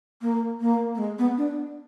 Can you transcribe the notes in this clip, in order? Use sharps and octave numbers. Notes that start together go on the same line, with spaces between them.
A#3
A#3
A#3
G#3
B3
D4